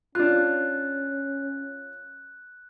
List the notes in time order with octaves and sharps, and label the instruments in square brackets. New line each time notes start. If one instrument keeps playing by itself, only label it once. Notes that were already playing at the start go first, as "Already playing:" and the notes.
[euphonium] C#4 [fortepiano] D4 F4 [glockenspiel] F#6